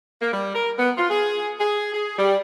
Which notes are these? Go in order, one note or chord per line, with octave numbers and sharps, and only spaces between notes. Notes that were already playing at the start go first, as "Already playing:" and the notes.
A#3
G3
A#4
B3
F4
G#4
G#4
G#4
G3